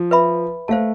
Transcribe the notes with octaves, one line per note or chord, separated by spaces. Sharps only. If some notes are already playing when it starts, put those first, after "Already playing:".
Already playing: F3
B4 E5 B5
A3 C5 F5 A5